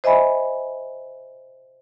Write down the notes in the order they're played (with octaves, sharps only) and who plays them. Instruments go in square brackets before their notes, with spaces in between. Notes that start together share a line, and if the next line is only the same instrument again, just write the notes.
[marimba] C5 D#5 E5 G#5 B5